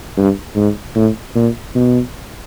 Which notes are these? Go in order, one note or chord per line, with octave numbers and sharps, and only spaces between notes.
G2
G#2
A2
A#2
B2